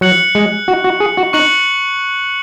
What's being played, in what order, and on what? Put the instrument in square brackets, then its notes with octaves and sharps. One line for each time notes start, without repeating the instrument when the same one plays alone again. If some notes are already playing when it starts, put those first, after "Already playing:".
[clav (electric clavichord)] F#3 [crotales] F#6 C#7 F#7
[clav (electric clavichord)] G#3
F#4
F#4
G#4
F#4
[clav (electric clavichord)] D#4 [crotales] C#6 F#6 C#7 F#7